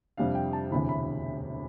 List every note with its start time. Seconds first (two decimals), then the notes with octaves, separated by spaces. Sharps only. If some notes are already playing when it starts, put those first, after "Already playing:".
0.17 F2 C3 G3 D4 F5
0.35 G5
0.53 A5
0.72 E1 D2 C3 E3 B5
0.89 B5